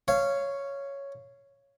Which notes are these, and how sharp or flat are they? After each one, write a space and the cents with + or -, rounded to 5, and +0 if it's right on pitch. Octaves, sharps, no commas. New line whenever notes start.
C#5 +0 F5 -20